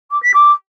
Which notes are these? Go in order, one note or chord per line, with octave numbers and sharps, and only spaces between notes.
D6
B6
D6